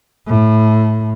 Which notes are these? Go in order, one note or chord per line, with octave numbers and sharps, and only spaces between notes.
A2